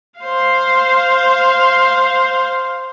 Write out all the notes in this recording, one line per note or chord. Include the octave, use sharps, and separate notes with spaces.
C5 F5